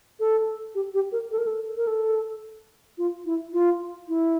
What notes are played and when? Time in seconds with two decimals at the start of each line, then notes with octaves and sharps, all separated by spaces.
0.20 A4
0.75 G4
0.94 G4
1.12 A#4
1.32 A4
1.38 A#4
1.47 A4
1.77 A#4
1.87 A4
2.98 F4
3.26 E4
3.53 F4
4.08 E4